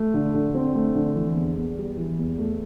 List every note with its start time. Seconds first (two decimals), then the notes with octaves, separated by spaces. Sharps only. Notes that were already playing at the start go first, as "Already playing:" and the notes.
Already playing: A3
0.14 D3
0.34 D3
0.54 C4
0.75 A3
0.95 D3
1.15 E3
1.36 E2
1.57 E2
1.78 G3
1.97 E3
2.19 E2
2.38 A3